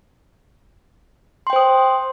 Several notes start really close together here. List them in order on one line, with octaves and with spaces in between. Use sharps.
C6 G5 C5 D#6